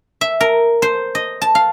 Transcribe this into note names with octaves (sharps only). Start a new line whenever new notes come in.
E5
A#4
C5
D#5
A5
F5